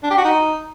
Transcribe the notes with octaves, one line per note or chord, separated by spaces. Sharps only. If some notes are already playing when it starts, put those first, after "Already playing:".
D4
G4
F#4
D#4